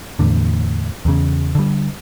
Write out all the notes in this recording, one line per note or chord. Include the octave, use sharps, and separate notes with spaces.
E2 A2 D3
E2 C#3
D3 G3